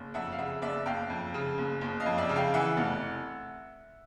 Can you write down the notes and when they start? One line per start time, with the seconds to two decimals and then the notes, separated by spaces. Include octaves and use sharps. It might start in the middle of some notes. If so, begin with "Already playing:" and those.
Already playing: F#1
0.14 F2 E5 F#5
0.32 F5
0.38 C#3 E5 F#5
0.62 F#1 D5 E5
0.86 F#1 F5 G5
1.10 F2
1.34 C#3
1.58 F#1
1.81 F#1
2.00 D#5 F5
2.06 F2
2.18 D5 E5
2.29 C#3
2.36 F5 G5
2.54 E3 E5 F#5
2.77 F1